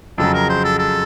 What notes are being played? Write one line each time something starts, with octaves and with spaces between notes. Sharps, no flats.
F2 C#3 F#3 A4
A#4
C5
A4
A4